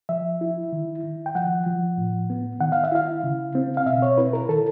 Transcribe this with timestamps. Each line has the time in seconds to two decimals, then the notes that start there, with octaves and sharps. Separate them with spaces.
0.09 F3 E5
0.41 E4
0.73 D#3
1.04 D#3
1.26 G5
1.35 F3 F#5
1.66 F3
1.97 A2
2.30 B3
2.61 D#3 F#5
2.72 F5
2.84 E5
2.92 E4 F5
3.24 C#3
3.55 C4
3.77 F5
3.86 B2 E5
4.02 C#5
4.18 E4 B4
4.33 A#4
4.49 D#3 A4